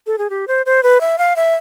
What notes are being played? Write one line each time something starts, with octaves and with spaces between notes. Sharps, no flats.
A4
G#4
G4
C5
C5
B4
E5
F5
E5